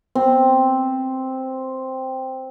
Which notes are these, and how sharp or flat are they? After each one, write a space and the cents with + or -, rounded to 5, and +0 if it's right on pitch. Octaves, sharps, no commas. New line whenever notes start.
C4 +0